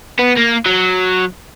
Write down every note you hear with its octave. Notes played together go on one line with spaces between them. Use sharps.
B3
A#3
F#3